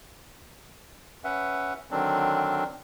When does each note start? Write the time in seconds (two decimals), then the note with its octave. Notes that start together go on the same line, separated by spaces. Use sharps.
1.24 C#4 B4 E5 F#5
1.91 D3 D#3 F#3 C4 D4